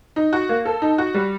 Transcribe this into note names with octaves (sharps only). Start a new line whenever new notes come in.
D#4
F#4
A#3
A4
D#4
F#4
G3